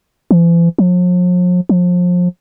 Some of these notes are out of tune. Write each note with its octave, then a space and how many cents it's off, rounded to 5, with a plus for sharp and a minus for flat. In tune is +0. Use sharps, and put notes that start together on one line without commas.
E3 +45
F3 +45
F3 +30